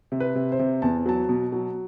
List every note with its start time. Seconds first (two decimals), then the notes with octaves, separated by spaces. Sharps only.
0.12 C3
0.20 B4
0.35 C3
0.52 C5
0.59 C3
0.82 E2 A5
1.06 F#3 A5
1.29 B2
1.52 F#3